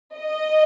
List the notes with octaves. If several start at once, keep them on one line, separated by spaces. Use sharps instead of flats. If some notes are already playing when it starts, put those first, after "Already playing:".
D#5